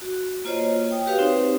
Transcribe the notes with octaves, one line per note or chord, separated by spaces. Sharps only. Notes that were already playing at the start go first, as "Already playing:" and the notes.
F#4
A#3 F4 C5 C#5 D#5
G5 D#6
F#4 G4 B4 C#5 F5
C4 D#4 C5